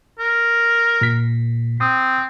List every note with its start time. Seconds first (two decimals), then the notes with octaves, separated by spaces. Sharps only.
0.19 A#4
1.01 A#2 B6
1.81 C4 D#6